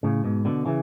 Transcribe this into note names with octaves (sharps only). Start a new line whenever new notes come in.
A2 C#3
G#2 B2
B2 D3
C#3 E3